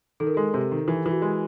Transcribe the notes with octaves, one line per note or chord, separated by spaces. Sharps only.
D#3 A4
A#4
G#3 A4
C3
D#3
E3 G4
E3
F#4
G#3